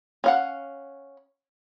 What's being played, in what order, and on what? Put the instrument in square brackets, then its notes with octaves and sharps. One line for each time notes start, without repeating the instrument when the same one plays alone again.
[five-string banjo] C#4 F5 F#5